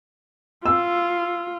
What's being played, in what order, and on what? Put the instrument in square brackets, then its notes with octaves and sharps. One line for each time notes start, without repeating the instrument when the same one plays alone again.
[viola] F4 [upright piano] E6